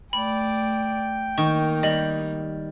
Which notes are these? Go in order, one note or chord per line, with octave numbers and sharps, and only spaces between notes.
A3 D5 G5 B5
D#3 A#3 D#4 C#6
G3 D#5 F#7